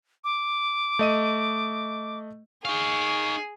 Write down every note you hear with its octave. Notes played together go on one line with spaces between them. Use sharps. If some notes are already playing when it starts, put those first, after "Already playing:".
D6
A3 D#5 D#7
D#4 G#4 F5 C#6